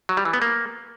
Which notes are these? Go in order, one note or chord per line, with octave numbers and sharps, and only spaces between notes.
F#3
G3
E3
B3
A#3